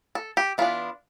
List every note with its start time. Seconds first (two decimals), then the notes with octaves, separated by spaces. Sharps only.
0.15 A4
0.37 G4
0.58 E3 B3 D4 F4